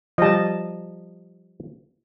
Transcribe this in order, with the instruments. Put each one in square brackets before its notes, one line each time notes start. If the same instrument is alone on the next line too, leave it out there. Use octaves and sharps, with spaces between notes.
[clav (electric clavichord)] F3 G3 [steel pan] D#5 A5